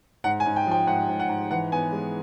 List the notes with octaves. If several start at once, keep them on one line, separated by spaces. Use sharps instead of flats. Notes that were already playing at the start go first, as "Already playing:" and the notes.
G#2 F#5
G#5
G#2
G5
F3 G5
G#2 F#5
G#2
F#5
G#2
E3 F#5
B3 G#5
G#3